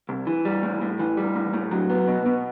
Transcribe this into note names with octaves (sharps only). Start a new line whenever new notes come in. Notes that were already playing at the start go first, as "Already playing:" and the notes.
C2
E3
G3
A2
A2
E3
G3
A2
A2
F#3
B3
B2
B2